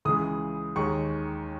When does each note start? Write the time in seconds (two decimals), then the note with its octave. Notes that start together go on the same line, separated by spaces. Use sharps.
0.05 C#2 C#3 E3 G#3 D#6
0.76 D#2 D#3 G#3 C#6